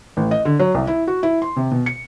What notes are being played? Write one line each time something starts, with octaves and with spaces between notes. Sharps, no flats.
A1
D#5
D3
F#3
C2
E4
F#4
E4
C6
C3
B2
C#7